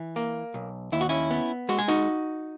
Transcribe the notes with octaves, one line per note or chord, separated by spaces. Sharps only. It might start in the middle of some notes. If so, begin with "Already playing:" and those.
Already playing: E3
A#3
B1
D#2 E4
F#4
C#4 E4
B3
G#3 F#4
G#4
D#4 F#4